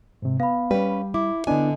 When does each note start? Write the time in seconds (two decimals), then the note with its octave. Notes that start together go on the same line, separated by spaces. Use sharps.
0.22 G#2 C3
0.40 B3 F5 B5
0.71 G3 C#4 B4
1.14 E4 D6
1.47 D3 B3 D4 E4 D#5 G#5